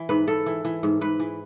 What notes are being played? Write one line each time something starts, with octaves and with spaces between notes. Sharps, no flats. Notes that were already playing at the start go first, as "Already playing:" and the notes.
Already playing: E3
G#2 B4
G#2 A4
E3
E3
G#2
G#2 B4
E3